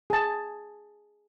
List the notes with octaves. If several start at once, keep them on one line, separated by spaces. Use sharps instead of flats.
G#4 A5